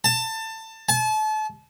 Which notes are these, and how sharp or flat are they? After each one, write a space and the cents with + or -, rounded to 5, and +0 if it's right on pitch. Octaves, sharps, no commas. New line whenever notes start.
A5 +20
A5 -35